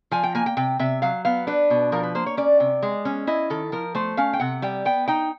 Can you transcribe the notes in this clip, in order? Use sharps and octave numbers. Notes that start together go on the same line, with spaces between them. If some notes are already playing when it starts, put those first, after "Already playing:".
F3 G#5
G5
A#3 G#5
G5
C3 G5
C3 E5
F#3 F5
B3 F5
D4 B4
B2
F3 A#4
B4
A#3 C5
C#5
C#4 D5
C3
G#3
C#4
E4 D#5
D#3 A4
F3 A#4
A3 C5
C#4 F5
G5
C3 F#5
G3 G5
B3 G5
D#4 G5